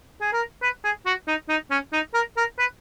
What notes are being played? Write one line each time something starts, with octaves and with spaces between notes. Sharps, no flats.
G#4
A#4
B4
G#4
F#4
D#4
D#4
C#4
D#4
A#4
A#4
B4